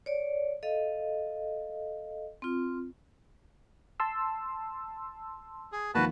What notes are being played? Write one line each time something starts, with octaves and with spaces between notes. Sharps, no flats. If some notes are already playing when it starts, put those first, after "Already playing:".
C#5 D5
A4 D#5 F5
C4 F4
A5 C6 E6
G#4
D#2 D#3 F3 F#4 B4 A5